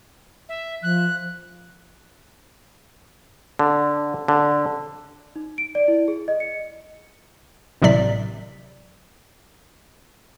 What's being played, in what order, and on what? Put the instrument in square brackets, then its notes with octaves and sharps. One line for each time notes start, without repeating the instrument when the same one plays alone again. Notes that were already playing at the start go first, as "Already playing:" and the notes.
[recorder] E5
[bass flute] F3 [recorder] F#6
[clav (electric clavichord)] D3
D3
[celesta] D#4
D7
D5
E4
G#4
D#5
C#7
[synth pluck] G#1 A2 C3 F#3 D5 B6